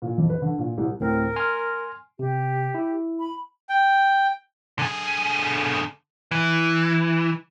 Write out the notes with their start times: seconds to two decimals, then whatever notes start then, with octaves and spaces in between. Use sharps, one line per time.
0.02 A#2
0.17 F2
0.29 B4
0.42 D3
0.58 A#2
0.78 C2
1.00 D2 A2 C4 A#4
1.36 G#5 C6 F6
2.19 C3 G4
2.75 E4
3.20 B5
3.69 G5
4.79 D3 G#4
6.31 E3